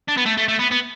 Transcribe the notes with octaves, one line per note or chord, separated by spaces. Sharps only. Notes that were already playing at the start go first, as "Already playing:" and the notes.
D4
B3
A3
A3
A3
B3
B3